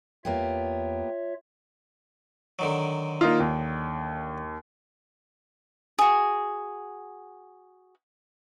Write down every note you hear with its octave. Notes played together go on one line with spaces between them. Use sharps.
E2 A#3 B3 F4 G4 C#5 E5
D3 D#3 F#3
A#3 D#4 F4
D#2
F#4 G#4